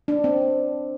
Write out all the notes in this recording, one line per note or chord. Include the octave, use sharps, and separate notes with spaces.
D4
C4